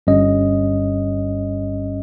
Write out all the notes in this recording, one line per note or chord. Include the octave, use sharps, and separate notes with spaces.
G1 G2 G3 C#4 D#5